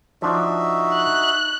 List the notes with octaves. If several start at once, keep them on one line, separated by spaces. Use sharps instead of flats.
F3 D4 D#4 F#4 E5
F#6